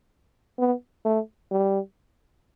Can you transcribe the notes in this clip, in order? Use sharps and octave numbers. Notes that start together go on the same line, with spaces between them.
B3
A3
G3